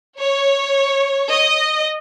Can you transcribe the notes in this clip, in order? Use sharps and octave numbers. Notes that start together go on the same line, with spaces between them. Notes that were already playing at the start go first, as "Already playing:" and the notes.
C#5
D#5